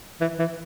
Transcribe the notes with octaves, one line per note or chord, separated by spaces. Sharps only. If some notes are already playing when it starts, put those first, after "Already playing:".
E3
E3